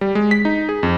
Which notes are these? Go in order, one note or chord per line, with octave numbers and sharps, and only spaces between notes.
G3
G#3
B6
D#4
G#4
F2